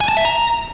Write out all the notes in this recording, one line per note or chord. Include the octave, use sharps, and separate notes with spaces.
G#5
A5
E5
A#5